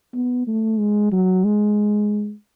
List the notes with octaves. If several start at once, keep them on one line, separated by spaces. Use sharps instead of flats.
B3
A3
G#3
F#3
G#3